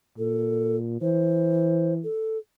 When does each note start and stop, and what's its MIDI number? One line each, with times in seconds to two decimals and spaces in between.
0.18 1.01 46
0.18 0.77 69
1.01 2.04 52
1.01 1.93 72
2.04 2.38 69